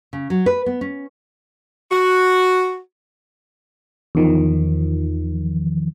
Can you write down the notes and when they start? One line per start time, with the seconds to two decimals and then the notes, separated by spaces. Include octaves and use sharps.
0.13 C#3
0.30 F#3
0.46 B4
0.66 B3
0.81 C#4
1.92 F#4
4.15 E2 D#3 F3